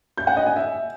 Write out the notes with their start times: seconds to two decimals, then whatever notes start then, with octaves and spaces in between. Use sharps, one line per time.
0.18 G6
0.27 F#5
0.37 D#5
0.46 G#5
0.56 E5